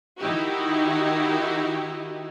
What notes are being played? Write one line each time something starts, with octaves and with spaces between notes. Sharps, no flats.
D#3 D#4 E4 F#4 G4